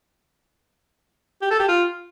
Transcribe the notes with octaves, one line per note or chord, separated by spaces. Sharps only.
G4
A4
G4
F4